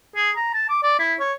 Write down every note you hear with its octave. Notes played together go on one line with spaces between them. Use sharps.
G#4
A#5
A5
D6
D5
E4
C#5